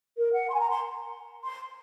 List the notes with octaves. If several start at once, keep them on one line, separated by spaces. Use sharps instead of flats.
A#4
F#5
C6
G#5
A#5
C6
C6